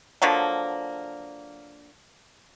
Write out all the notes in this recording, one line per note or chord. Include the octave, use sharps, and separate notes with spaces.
D3 F3 F#3 A#3